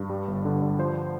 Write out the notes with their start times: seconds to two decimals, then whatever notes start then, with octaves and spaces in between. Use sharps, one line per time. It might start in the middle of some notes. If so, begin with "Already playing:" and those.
Already playing: G2
0.10 G3
0.28 G1
0.45 D3
0.62 G2
0.79 F3 C5